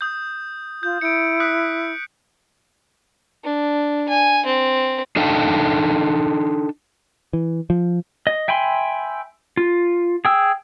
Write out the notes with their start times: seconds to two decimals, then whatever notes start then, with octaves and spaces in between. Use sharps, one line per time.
0.01 D#6 G6
0.83 F4 G6
1.01 E4 C#7 D7
1.40 D#6 F#6 B6
3.44 D4
4.09 G#5
4.46 C4
5.16 D4 D#4 A4 F5 G5 A5
7.33 E3
7.70 F3
8.27 D#5
8.48 E5 G5 G#5 B5 C6
9.57 F4
10.25 G#4 G5 E6